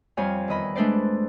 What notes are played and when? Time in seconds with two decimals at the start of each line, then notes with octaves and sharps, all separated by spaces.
0.17 F2 G3 C5 C#5 F5 G#5
0.48 E2 D#3 D#5 B5
0.75 G#3 A3 D4 B4 C5 D5